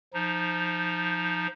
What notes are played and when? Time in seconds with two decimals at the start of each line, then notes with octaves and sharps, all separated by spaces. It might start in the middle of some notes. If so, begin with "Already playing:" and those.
0.14 F3 D#4